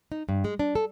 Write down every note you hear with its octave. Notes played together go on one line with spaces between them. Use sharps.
D#4
G2
G#3
D4
A4